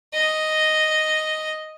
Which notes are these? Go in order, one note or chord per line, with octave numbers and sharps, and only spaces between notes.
D#5